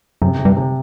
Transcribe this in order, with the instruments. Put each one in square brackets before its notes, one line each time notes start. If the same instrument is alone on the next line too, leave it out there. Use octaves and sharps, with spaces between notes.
[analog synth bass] F#2 [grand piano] C3
[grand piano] C3
[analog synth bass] G2
[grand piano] C3